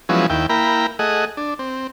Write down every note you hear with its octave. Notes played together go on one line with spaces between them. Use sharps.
F3 F#3 G#3 B3 C#4 E4
D#2 E4 G5
A#3 E4 G5 A#5 B5
A3 G#4 D#5 F#5
D4
C4